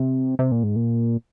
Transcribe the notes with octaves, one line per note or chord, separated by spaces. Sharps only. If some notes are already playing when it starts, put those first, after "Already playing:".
Already playing: C3
C3
A#2
G#2
A#2